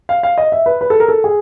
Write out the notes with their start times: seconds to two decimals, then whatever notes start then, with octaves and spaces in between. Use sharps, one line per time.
0.09 F5
0.23 F5
0.38 D#5
0.52 E5
0.66 B4
0.81 B4
0.90 A4
1.00 A#4
1.08 A4
1.24 G#4